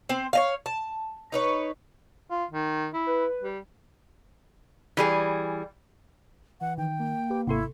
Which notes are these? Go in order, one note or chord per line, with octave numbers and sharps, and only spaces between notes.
C4 C5
C#5 D#5 F5
A5
D#4 B4 C#5
F4
D#3
E4
B4
G3
E3 G3 G#4
E3 F#5
D#3 G5
A#3
G4 B4 D6
G#1 C3 E4 A4 C6 C#6